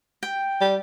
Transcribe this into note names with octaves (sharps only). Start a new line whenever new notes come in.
G5
G3